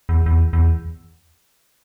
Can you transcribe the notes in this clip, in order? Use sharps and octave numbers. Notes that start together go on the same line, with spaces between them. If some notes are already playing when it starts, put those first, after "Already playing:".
E2
E2
E2